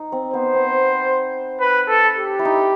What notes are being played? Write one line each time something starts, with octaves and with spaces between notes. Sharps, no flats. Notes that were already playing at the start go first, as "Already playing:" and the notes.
Already playing: D#4
C4
B3 C5
C4
B4
A4
G4
E4
D#4